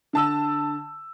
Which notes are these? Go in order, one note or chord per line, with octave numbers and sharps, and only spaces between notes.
D3 A5 E6